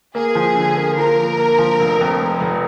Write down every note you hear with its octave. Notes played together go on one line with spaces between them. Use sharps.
A#3 G#4
F3
D3
A#3
F3 A#4
A#3
A#3
F3
F1
F2
F1
F1